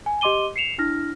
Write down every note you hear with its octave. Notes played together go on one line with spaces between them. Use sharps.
G#5
G4 D#5 C6 D6 D#7 G7
C7 C#7 E7 F7
D4 E4 F6 A#6